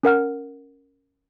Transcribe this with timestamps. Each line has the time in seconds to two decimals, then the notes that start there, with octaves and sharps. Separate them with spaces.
0.03 C#4 A#4 F#5 F6